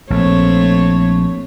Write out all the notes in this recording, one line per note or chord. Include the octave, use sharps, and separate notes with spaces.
A#1 A3 C4 C#5